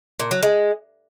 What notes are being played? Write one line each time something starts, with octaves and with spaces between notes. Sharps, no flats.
A#2
F#3
G#3